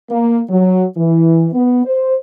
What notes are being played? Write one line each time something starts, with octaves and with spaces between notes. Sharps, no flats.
A#3
F#3
E3
B3
C5